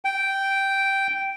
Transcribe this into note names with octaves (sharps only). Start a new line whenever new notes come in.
G5